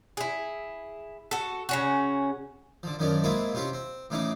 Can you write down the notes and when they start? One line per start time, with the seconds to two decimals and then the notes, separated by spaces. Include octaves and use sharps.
0.17 E4 G#4
1.31 F#4 A4
1.69 C#3 C#4 F#4
2.83 D3 F3
2.99 F#2 D#3 F3 C#4 D4
3.24 G#3 A#3 C4 E4 F4
3.54 C3 C#4 F4 G4
3.73 C4
4.10 A2 C#3 E3 D#4 D6